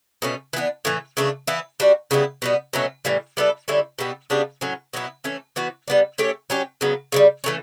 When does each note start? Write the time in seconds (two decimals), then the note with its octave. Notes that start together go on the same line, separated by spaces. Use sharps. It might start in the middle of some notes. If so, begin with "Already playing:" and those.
0.22 B2 A3 C#4
0.53 E3 B3 D4
0.85 A2 E3 A3
1.17 C#3 E3 A3 D4
1.47 E3 B3 E4
1.80 G3 D4 F#4
2.11 C#3 G3 B3 E4
2.42 B2 G3 B3
2.73 B2 F#3 A3 C#4
3.05 A2 E3 G3
3.37 G3 B3 E4 A4
3.68 D3 G3 C#4 E4
3.99 B2 G3 B3 E4
4.30 C#3 G3 B3 D4
4.61 A2 F#3 C#4
4.93 B2 F#3 B3 E4
5.24 E3 A3 C#4
5.56 E3 B3 F#4
5.88 G3 B3 D4
6.18 A3 C#4 G4 C#5
6.50 F#3 C#4 G4
6.81 C#3 F#3 B3
7.12 C#3 E3 G3
7.44 E3 A3 C#4